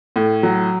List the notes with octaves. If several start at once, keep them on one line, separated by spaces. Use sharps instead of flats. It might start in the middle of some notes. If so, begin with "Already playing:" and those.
A2
F#3